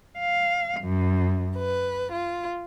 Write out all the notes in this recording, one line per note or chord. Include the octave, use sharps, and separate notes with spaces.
F5
F#2
B4
F4